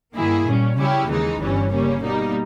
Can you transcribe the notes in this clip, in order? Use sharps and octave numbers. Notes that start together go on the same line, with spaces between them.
G2 D#3 A#3 E4 G#4
A#2 G3 C#4
C#3 G3 C#4 E4 G4
D#2 C#3 E3 G#3 D#4
G1 G2 E3 G3 C#4
C#3 G3 A#3 C#4
B2 G3 A#3 D#4